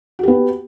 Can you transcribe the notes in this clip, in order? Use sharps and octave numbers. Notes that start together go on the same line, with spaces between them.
B3 F#4 G4